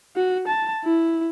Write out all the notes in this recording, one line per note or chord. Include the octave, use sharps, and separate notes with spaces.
F#4
A5
E4